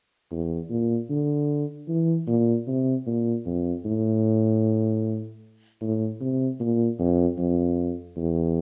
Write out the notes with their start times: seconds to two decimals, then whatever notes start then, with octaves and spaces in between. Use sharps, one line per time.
0.31 E2
0.70 A#2
1.10 D3
1.88 E3
2.27 A#2
2.67 C3
3.07 A#2
3.46 F2
3.85 A2
5.81 A2
6.21 C3
6.60 A#2
6.99 F2
7.38 F2
8.17 E2